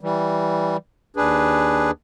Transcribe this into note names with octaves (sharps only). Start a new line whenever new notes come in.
E3 G3
D#2 D4 G#4 B4